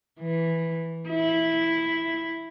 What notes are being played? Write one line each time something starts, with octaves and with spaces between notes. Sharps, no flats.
E3
E4